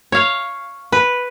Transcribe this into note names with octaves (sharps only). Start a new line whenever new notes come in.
C#5 F5
B4